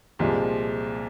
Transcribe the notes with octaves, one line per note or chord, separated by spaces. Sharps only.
C2 A#2 F3 G#3